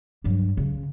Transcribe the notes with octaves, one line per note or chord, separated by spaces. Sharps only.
G2 F#3
C#3